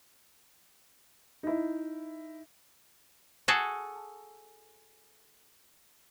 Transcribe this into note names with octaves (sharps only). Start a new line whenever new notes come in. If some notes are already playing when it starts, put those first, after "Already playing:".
D#4 E4
F#4 G#4 A4